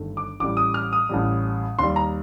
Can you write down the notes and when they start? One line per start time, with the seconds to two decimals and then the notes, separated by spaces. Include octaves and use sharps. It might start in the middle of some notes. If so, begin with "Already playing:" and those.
Already playing: G1 G2 D#3 A3
0.17 D6
0.40 A1 A2 G3 D6
0.57 D#6
0.74 F6
0.93 D#6
1.09 A1 A2 G3
1.79 D#2 D#3 G3 C6
1.96 A#5